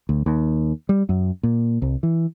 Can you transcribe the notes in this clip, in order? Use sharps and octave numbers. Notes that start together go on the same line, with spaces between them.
D2
D#2
G3
F#2
A#2
C2
E3